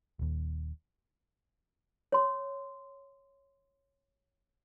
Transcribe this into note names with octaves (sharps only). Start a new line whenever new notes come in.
D#1 D#2
C#5 C6